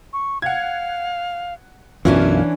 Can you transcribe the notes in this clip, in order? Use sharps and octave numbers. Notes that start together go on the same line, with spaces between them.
C#6
F5 F#5 G#6
B1 F#2 E3 C#4 D4 F4 E5